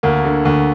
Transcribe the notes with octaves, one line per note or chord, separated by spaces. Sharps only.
D2 A#3
D3
D2